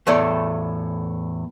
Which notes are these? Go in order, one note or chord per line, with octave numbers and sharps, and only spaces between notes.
E2 A2 A3 C#5 D5